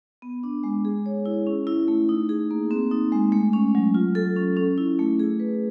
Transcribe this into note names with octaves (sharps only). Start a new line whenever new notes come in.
B3
D4
G#3
G#4
C#5
E4
C#4
E4
A3
D#4
G#4
A#3
C4
D#4
G#3
A3
C#4
F#3
F4
A4
C#4
C#4
E4
A3
G#4
B4